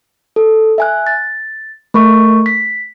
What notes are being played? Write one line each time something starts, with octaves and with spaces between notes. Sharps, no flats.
A4
E5 G#5 F#6
A6
A3 A#4 C#6
B6